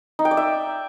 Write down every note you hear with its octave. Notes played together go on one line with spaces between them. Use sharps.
D#4
G5
D5
E5